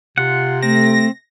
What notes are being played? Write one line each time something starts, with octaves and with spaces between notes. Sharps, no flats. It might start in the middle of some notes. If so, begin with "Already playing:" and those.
C3 F4 F#5
A3 C4 A#6